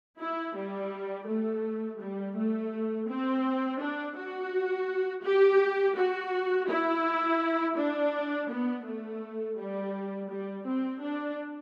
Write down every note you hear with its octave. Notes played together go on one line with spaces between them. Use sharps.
E4
G3
A3
G3
A3
C4
D4
F#4
G4
F#4
E4
D4
B3
A3
G3
G3
C4
D4